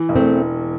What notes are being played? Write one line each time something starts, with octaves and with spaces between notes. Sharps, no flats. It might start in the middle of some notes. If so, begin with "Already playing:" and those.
Already playing: E3
E1
A3 C4